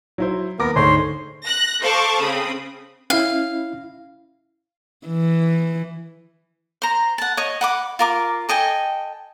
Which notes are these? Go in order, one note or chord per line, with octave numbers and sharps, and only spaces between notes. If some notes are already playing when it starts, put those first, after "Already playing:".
F#3 E4 C5
D#2 B3 A#4 D6 A#6
D2 G#2 D3 C5 C#5 C6
F#6 A#6
A4 C5 F5 A5 C#6 D6
C#3 C4 B5 D#6
C#4 E4 F5
E3
C5 A#5
F#5 A5
C#5 D#5
F#5 B5 D6
F4 A#4 D6
A4 D#5 G5 G#5